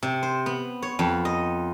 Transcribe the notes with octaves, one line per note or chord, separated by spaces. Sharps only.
C3
C5
B3
C#5
F2
D#5